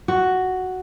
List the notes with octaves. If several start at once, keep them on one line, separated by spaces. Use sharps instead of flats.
F#4